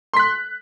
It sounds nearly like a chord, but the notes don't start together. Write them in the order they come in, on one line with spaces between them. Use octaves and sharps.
C6 B6 F#6